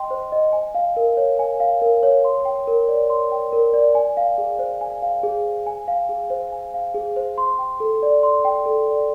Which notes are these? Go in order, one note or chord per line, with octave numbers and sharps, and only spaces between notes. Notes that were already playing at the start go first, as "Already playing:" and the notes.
Already playing: D#5 G5 C6
C5
D#5
G#5
F5
A#4
C#5
G#5
F5
A#4
C#5
C6
G5
A#4
D5
C6
G5
A#4
D5
G#5
F5
G#4
C5
G#5
F5
G#4
C5
G#5
F5
G#4
C5
G#5
F5
G#4
C5
C6
G5
A4
D5
C6
G5
A4
D5